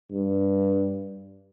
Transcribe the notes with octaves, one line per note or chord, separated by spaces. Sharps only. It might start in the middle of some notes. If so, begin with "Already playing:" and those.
G2